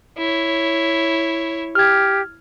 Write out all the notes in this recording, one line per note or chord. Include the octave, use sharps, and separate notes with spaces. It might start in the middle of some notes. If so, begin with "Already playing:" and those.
E4 C#5
G4 F6 G#6